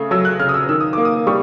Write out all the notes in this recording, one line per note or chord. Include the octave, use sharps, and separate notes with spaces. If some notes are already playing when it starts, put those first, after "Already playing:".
Already playing: C#3 A3 D#6
F#3 E6
F#6
C#3 F6
D#6
E6
D#3 E6
D#6
A#3 D6
D#6
G3 C#6